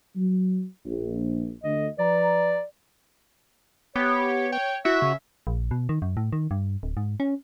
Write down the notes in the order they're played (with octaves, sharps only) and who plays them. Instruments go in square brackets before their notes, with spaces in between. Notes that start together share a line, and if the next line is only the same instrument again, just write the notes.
[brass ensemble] F#3
A#1
[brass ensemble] D2 [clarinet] D#5
[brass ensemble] F3 B4 A#5 [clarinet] D5
[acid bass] B3 [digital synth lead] G4 [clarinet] C#5
[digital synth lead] C#5 [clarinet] G5
[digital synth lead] E4 [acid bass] F#4 [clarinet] E5
[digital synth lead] C#3
[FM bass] A#1
B2
D#3
F#2
A2
D#3
G2
D1
G#2
C#4